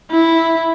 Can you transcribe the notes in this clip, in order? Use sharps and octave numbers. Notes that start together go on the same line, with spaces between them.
E4